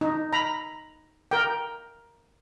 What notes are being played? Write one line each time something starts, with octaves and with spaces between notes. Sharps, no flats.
D#4
A#5 B5
A#4 G5